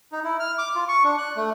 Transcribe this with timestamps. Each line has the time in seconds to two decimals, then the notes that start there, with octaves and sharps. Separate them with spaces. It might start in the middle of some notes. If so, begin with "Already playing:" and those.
0.12 D#4
0.24 E4
0.40 F6
0.58 D6
0.75 F4
0.88 C#6
1.04 D4
1.18 F#6
1.36 A3